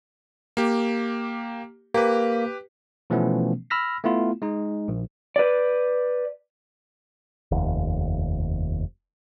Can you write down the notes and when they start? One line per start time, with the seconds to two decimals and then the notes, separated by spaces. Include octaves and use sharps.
0.57 A#3 G4
1.94 A#3 G4 B4
3.10 B2 E3 F3 A3 B3 C#4
3.70 B5 E6 F6 A#6 B6
4.04 A3 B3 E4 F4
4.42 G#3 D#4
4.88 A#1
5.36 B4 D5
7.51 F1 D#2